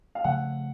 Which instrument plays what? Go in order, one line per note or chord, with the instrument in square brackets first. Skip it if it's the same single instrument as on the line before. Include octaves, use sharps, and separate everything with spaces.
[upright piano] F5
[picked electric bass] C#3 F3 A3 [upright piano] F#5